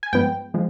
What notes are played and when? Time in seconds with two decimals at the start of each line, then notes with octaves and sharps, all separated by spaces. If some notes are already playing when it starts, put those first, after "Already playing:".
0.03 G#5
0.13 G2 F3 G#3 B3 G5
0.54 F3 G#3